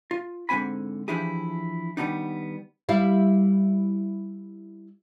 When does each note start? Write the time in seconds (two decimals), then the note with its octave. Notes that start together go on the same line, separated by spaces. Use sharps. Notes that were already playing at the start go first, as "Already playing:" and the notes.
0.11 F4
0.49 G#2 D3 C4 G#5 B5
1.08 E3 F3 D4 E4 G4 G#4
1.97 D#3 G3 A3 B3 D4 D#4
2.89 G3 E4 F5